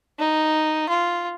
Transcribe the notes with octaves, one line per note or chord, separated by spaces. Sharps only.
D#4
F4